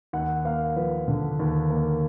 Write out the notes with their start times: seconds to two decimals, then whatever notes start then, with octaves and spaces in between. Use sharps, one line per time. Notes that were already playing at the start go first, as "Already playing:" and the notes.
0.13 D#2 F#5
0.45 A#3 F5
0.76 F3 B4
1.08 D3
1.39 D#2
1.70 A#3